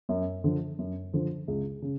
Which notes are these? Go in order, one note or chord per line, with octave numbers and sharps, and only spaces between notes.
F#2
D3 F3
F#2
D3 F3
C#2
C#3